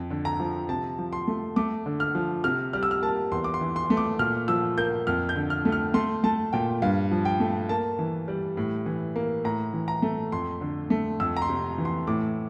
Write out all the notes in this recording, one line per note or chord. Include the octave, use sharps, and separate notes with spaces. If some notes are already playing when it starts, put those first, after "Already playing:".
Already playing: F2
D3
A#5
F3
C3 A5
F3
C6
A3
A3 D6
D3
F6
F3
C3 F6
G3 F6
E6
F6
A#3 A5
E2 C6
D6
C6
E3
C6
A3
D6
A#2 F6
F3 E6
A#3 G6
F2 F6
G6
D3
F6
A3
F6
A3 C6
A3 A5
A#2 G5
G2 F5
F3
G5
A3
A#3 A5
E3
G3
A2
E3
A#3
A2 A#5
E3
A#5
A3
F2 C6
D3
A3
F2 E6
A#5
C6
C3
E3
C6
A2 D6